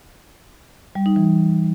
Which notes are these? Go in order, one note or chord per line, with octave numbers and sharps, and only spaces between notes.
G3
D#4
E3